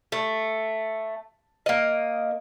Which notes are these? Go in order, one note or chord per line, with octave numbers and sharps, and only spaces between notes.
A3
A#3 D#5